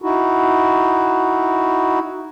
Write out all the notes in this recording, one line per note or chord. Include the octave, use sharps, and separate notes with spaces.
D#4 E4 F#4